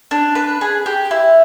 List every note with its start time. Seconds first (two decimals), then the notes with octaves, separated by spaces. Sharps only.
0.11 D4
0.35 B4
0.61 G#4
0.86 G4
1.11 E4